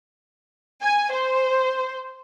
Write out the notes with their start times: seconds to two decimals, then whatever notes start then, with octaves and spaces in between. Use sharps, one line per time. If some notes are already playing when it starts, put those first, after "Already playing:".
0.83 G#5
1.13 C5